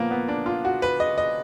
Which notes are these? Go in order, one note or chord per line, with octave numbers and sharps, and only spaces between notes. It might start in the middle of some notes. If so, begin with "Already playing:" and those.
Already playing: A#2 F3 A#3 B3
B3
D4
F4
F#4
B4
D#5
D#5